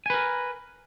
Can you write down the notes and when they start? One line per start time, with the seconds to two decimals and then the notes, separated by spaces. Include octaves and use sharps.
0.06 G#5
0.10 B4
0.14 A#4